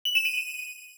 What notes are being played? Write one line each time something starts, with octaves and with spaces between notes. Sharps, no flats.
F#7
E7
D#7